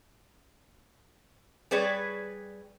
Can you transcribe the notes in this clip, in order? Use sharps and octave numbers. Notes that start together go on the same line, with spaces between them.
G3 G#4 B4 C#5 D5